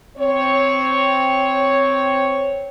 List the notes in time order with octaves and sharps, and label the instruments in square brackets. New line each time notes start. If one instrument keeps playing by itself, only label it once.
[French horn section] C4 C#5